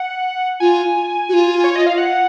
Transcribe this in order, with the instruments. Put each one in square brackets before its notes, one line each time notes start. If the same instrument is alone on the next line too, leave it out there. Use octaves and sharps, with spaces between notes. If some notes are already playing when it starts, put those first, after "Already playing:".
Already playing: [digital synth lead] F#5
[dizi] F4 [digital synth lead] G#5
[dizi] F#4
F4
[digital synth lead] C#5
D#5
F5
F#5